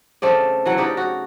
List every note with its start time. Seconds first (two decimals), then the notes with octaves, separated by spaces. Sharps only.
0.22 C#3 A3 C4 D5
0.65 E3 F#3 F#5
0.77 C#3 D#4 G4 D5
0.97 F#4